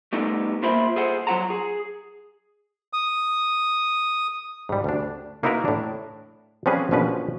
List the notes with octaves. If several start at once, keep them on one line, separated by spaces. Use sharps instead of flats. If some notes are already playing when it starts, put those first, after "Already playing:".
G3 A3 B3 D#4 A4
A#2 A#3 F4 C5 E5 B5
G#4 A4 C5 F#5
F#3 C4 F4 F#5 A5 A#5
G#4
D#6
G#2 G3
D2 D4
A#3 D#4 E4 F#4 A#4 B4
A2 D4
F3 G3 C4 C#4 G#4 B4
A#1 B2 F3 C#4 B4